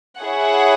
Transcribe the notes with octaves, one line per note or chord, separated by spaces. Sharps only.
E4 G#4 C#5 F#5